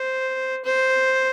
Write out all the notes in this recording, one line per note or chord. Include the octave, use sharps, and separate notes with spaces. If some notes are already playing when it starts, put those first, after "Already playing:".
Already playing: C5
C5